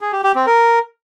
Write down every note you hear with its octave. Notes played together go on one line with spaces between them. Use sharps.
G#4
G4
G4
C4
A#4